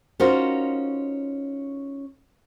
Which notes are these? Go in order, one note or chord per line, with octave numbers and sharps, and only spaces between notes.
C#4 D#4 F4 F#4 A#4 C5